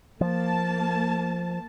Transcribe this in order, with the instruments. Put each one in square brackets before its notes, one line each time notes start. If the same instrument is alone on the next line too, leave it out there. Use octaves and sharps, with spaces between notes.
[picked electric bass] F3 [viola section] A#3 A5